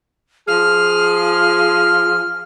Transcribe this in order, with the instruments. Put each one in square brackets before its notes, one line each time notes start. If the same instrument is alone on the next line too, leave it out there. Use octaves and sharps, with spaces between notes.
[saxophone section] F3 G#4 [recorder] F6